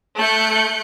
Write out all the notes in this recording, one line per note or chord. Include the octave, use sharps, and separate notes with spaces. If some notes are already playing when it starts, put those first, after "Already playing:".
A3 F#6 G6 C#7